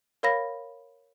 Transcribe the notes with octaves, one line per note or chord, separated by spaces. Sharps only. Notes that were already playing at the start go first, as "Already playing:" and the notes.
A#4 C#5 F5 B5 A#6